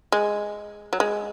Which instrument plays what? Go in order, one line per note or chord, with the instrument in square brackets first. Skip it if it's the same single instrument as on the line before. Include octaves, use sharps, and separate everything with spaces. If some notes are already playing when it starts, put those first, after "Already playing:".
[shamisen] G#3
F#3
G#3